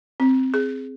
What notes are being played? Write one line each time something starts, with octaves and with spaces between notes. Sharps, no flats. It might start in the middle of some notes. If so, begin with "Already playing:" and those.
C4
G#4